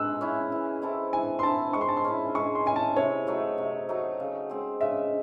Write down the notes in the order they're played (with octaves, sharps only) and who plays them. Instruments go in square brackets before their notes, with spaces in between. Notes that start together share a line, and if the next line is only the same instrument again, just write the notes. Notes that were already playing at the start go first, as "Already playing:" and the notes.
Already playing: [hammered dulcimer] G#3 [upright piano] E6 F#6
[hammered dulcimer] C#4 E4
E3
C4 E4 A4
[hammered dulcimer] E3 [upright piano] G#5
[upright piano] C6
[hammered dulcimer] C4 E4 A4 [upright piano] A5
[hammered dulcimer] G#3 [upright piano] C#6
[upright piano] C6
A5
C6
[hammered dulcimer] C#4 E4
[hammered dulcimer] G#3 [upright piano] C#6
[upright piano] C6
[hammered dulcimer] C#4 E4 [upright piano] G#5
[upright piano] A5
[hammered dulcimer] C3 [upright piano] C#5
[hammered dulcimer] F#3 A3 D#4
C3
F#3 A3 D#4
C#3
G#3 C4
[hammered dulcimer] C#3 [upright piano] E5